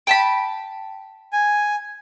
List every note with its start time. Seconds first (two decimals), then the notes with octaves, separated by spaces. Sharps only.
0.07 G5 A5 B5
1.33 G#5